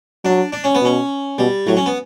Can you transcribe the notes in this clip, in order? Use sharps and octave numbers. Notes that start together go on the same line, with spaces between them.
F#3 D4
D4
C#4
B3
B2 C#4
B2 G3
A2 F#3
C#4
B3